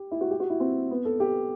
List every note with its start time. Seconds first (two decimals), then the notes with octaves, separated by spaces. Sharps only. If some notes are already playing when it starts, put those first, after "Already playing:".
Already playing: G4
0.11 E4
0.21 F#4
0.30 G4
0.40 F#4
0.50 E4
0.60 C4
0.91 B3
1.05 A4
1.20 G4